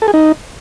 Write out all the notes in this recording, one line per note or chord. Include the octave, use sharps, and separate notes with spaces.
A4
G#4
D#4